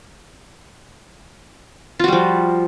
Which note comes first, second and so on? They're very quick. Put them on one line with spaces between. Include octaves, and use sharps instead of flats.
F4 F#4 G3 F3